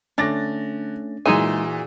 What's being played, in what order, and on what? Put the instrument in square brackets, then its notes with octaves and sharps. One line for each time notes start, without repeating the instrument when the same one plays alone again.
[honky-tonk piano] D3 A6 A#6 [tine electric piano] A3 C#4 [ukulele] D4
[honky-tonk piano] A#2 E3 [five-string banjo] G#3 D#4 G#5 [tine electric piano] F#4 G#4 E6